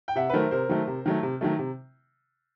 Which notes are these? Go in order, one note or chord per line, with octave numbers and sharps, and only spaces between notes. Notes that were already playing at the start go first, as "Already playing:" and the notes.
G5
C3 E5 F#5
B4
D#3 F#3 A3 A#4 C5
C3 A#4 C5
D#3 F#3 A3
C3
D#3 F#3 A3
C3
D#3 F#3 A3
C3